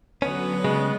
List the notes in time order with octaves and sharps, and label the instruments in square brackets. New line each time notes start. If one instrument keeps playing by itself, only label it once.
[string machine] D3 F#3 [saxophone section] B3 B4 [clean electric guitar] C#4
[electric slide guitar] C#3 [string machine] G3 [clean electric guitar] G#3